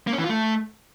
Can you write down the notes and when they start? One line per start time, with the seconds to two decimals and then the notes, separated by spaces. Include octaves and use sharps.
0.07 A#3
0.13 C#4
0.18 E3
0.24 F4
0.29 A3